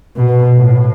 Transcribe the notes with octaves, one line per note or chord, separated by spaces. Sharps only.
B2
A2